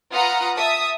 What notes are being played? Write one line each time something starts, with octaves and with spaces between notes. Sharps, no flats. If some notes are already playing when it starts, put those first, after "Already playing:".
F4 B4 F#5 A#5 D#6 F6
E5 A5 D#6